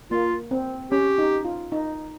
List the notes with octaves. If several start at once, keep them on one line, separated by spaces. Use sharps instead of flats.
A#3 F4
C4
C#4 G4
D#4
F4
D#4